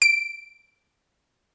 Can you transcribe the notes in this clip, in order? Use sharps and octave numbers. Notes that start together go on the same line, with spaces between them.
D7